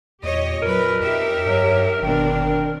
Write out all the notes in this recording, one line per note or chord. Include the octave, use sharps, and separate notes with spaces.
E2 A#2 G4 C#5 D#5
F2 F#3 A#4 B4
F2 D#4 G4 E5
G2 F#3
G1 B2 D#3 C4 D4